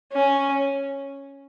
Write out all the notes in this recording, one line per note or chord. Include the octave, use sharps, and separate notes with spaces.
C#4